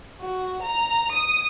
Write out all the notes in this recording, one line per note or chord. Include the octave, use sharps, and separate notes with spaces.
F#4
A#5
D#6